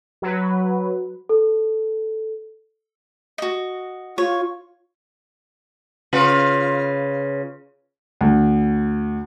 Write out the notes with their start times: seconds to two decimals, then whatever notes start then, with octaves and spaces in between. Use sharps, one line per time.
0.22 F#3 B4
1.29 A4
3.38 F#4 D#5
4.18 F4 C#5
6.13 C#3 F4 B4
8.21 D2